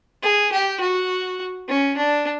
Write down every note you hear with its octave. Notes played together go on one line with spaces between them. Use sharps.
G#4
G4
F#4
C#4
D4